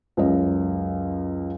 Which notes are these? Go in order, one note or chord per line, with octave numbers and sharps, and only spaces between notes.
C#2 F#2 D#5